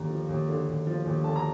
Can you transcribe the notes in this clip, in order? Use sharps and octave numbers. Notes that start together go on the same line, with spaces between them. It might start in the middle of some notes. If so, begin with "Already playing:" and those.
Already playing: D#2 D3 A#5
F3
D#2
D3
D#2
F3
D#2
D3 A5
A#5